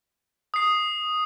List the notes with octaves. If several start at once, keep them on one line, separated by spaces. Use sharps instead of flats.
D#6 C7